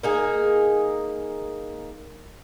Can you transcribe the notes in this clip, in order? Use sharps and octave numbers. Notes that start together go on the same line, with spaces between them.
A#3 D#4 G#4